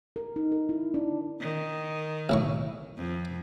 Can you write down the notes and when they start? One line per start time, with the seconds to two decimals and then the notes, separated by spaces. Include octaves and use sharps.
0.16 A#4
0.36 D#4
0.52 A#4
0.69 E4
0.94 D4
1.40 D#3
2.29 B1 A2 C#6
2.97 F2